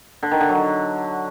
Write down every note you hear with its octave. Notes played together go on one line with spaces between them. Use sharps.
D3
D#3
D3
F#3